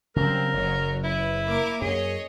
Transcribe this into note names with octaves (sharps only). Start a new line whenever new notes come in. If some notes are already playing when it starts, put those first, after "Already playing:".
C#3 F#3 G3 C4 A#4
F#1 C#3 F#3 C#5
E4 B4
A#3 A#4 D6
F#2 G#4 C#5 D#5